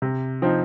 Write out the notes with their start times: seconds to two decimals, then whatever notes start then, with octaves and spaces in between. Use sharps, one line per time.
0.02 C3
0.42 F3 C4 D#4